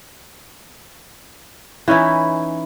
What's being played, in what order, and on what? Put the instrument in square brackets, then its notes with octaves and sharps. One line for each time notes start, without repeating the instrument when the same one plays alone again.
[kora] E3 C#4 D#4 E4